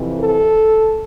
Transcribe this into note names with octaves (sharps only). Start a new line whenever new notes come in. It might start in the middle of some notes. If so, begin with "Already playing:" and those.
Already playing: F2 C3 E3
A4